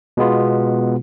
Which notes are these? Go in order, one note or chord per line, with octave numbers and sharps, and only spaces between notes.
B2 G#3 B3 F4